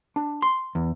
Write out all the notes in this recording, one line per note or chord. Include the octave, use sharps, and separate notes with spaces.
D4
C6
E2